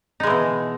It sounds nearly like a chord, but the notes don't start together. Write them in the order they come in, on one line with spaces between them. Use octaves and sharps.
D#4 G#3 E3 B2